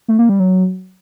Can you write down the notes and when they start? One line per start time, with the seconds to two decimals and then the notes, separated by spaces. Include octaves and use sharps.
0.08 A3
0.19 A#3
0.29 G3
0.40 F#3